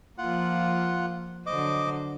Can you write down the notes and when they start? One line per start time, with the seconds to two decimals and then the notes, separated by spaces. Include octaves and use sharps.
0.18 F3 A#3 F4 F#5
1.46 D3 F#3 C5 D#5 D6